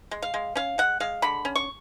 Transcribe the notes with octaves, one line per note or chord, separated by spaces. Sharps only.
G#3
F5
G#3
C#4 F5
G#3 F#5
G#3 F5
D3 B5
C#4
C#6